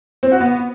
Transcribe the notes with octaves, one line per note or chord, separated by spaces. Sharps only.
C4
F#4
B3